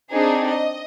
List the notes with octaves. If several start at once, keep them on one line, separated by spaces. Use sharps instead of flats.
C4 D4 D#4 G#4
D#5